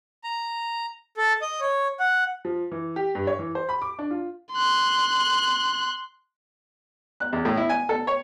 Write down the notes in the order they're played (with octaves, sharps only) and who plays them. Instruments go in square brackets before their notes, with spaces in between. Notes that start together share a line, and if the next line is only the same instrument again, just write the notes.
[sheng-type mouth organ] A#5
A4
D#5
C#5
F#5
[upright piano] F3
E3
G4
G2
C#5
E3
C5
B5
D6
D4
F4
[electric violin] C6 F#6
[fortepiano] F#6
E2
A2
E4
G#5
A4
C#5